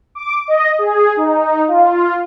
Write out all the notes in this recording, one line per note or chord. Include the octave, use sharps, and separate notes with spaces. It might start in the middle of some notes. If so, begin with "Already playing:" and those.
D6
D#5
G#4
D#4
F4